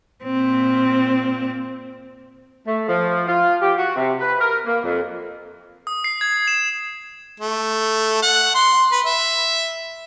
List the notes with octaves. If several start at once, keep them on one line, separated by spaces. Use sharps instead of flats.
A#2 C4
A3
F3
F4
G4
F#4
C3
B4
A#4
A#3
F2
D#6
C7
G#6
E7
A3
F#5
C6
B4
E5